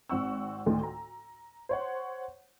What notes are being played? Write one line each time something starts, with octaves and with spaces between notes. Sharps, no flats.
G#1 C4 F#5 C#6 E6
D2 A2 D#3 A3
A#5
C5 C#5 F#5